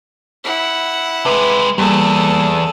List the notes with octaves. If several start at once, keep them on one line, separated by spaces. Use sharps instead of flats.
E4 F#5
C3 G#3 B4 B5
E2 G3 A#3 G#4 A4